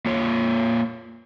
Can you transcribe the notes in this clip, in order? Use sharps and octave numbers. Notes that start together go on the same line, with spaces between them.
A#3 F4 C#5